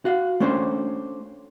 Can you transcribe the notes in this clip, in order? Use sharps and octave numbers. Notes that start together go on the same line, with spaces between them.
F#4 F5
A3 C#4 D4 C5